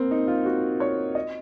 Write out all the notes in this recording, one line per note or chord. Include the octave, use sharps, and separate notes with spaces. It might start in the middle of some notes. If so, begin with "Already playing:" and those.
Already playing: A#3 C4
D#4
F4
F#4
C#5
D#5